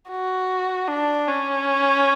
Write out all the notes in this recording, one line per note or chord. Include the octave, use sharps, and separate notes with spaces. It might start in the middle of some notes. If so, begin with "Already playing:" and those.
F#4
D4
C#4